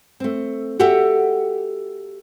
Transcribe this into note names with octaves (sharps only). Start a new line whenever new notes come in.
A3 C4
F#4 G4 A4 E5 F#5 G5